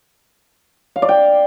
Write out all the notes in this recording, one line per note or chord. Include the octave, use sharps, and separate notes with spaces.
F5
D5
G5